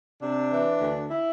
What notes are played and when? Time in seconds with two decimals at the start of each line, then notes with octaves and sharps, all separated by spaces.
0.21 C3 D4
0.51 E3
0.81 D2
1.11 E4